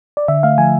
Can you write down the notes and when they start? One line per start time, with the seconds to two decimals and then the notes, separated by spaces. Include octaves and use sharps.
0.17 D5
0.28 D3 E5
0.43 A3 F5
0.58 F3 G#5